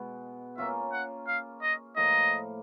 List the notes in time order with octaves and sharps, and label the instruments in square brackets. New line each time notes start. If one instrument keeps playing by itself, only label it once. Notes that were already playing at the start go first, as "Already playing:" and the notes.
Already playing: [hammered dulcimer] B2 G#3 B3
[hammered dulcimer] A#3 C#4 F4 [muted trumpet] E5
[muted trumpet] F#5
F5
D#5
[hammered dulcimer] A2 F3 A#3 [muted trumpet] D#5